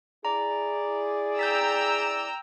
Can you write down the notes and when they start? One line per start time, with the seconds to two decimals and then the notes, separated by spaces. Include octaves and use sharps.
0.25 E4 G#4 D5 A#5
1.39 G5 A#5 E6 G6 A6 B6